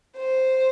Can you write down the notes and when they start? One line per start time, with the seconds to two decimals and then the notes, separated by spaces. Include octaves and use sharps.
0.17 C5